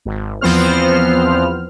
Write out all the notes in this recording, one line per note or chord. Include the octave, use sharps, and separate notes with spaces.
G#1
E2 F3 B3 C4 C5 F6